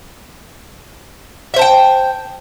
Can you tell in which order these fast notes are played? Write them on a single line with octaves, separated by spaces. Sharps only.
E5 C5 A5 G5